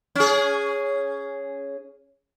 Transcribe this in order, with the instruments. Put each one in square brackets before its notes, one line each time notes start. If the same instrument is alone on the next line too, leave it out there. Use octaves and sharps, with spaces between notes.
[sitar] C#4 G#4